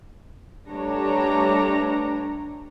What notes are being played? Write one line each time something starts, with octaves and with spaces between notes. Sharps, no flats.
G3 A3 D4 B4 C#5 A#5